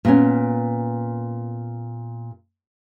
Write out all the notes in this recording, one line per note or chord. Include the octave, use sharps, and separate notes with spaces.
A#2 B3 C#4